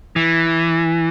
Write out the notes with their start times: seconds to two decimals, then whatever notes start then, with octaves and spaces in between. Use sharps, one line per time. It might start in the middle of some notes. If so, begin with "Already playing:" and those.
0.16 E3